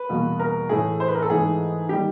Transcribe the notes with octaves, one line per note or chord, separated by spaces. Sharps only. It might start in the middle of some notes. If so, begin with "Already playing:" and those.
Already playing: B4
E2 B2 G3 A#3
A#4
A2 E3 A3 G#4
C5
B4
A#4
A4
G#2 E3 A3 G#4
D#3 G3 G4